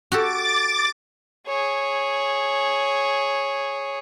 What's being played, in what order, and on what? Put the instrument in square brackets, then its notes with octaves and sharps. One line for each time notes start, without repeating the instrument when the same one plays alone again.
[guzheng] F#4 G4 A4 [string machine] D6 A6
[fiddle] G#4 C#5